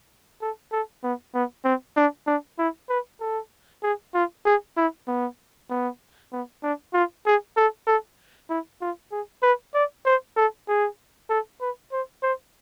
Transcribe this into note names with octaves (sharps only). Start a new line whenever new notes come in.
A4
A4
B3
B3
C4
D4
D4
E4
B4
A4
G#4
F4
G#4
E4
B3
B3
B3
D4
F4
G#4
A4
A4
E4
F4
G#4
B4
D5
C5
A4
G#4
A4
B4
C5
C5